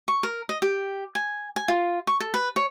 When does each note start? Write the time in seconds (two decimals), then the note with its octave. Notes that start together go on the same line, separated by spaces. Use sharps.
0.08 C#6
0.23 A#4
0.49 D#5
0.62 G4
1.15 G#5
1.56 G#5
1.68 F4
2.07 C#6
2.20 A4
2.34 B4
2.56 C#5